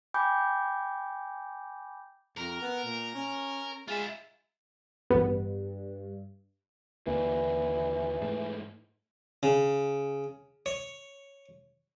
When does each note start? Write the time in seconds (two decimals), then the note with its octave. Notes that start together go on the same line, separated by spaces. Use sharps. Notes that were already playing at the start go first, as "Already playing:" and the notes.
0.14 G5 G#5 B5 D6 G6
2.38 F2 A#4
2.61 B3
2.84 A#2
3.15 C#4
3.88 G#3 F4 E5
5.10 A1 G2 B3
7.07 D#2 D3 E3 A#3
8.21 G#2 A3
9.43 C#3
10.66 C#5